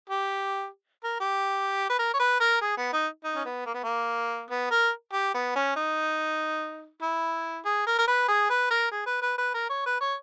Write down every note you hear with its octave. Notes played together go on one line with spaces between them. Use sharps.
G4
A#4
G4
B4
A#4
C#5
B4
A#4
G#4
B3
D#4
D#4
C#4
B3
A#3
B3
A#3
B3
A#4
G4
B3
C#4
D#4
E4
G#4
A#4
A#4
B4
G#4
B4
A#4
G#4
B4
B4
B4
A#4
C#5
B4
C#5